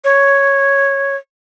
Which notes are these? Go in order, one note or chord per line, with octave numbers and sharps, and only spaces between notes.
C#5